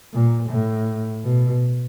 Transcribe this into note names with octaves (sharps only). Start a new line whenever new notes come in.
A#2
A2
B2